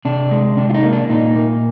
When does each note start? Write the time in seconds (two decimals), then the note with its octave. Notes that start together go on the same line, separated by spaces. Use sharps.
0.05 C3 D4
0.31 G#3
0.57 C3 D4
0.70 F4
0.74 D#4
0.83 A#3
0.93 D4
1.10 A#2 D#4
1.36 A#3